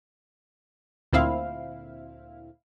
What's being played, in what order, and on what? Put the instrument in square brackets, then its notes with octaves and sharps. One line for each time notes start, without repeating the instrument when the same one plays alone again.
[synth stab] D2 A#2 C4 E4 F5